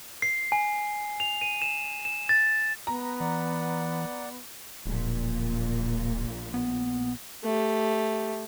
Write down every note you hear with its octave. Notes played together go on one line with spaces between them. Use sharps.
C7
G#5
F7
D#7
E7
E7
A6
B3 A#5
E3 D5 F#5
D1 A#1 A#2
B3
A3 G4